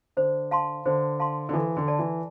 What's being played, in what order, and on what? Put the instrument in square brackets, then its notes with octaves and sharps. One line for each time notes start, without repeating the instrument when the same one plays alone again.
[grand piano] D3 [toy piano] C5
[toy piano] F5 A5 C6
[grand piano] D3 [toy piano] C5
[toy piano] F5 A5 C6
[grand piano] D3
[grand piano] E3 [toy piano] A4
[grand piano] D3
[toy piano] D5 A5
[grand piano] E3